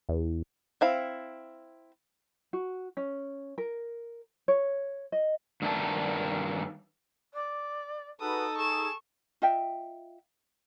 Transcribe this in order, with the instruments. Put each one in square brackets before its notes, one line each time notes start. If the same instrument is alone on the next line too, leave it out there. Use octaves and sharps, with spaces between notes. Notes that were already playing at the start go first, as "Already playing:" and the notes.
[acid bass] E2
[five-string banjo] C4 E4 F5
[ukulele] F#4
C#4
A#4
C#5
D#5
[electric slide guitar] G2 D#3 A#3 G#4 E5 A5
[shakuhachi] D5
[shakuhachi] D#4 [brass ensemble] F#4 G#4 B4 [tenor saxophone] A4 [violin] D#6
[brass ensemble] G#4 [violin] C#6 E7
[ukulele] F4 D#5 E5 G5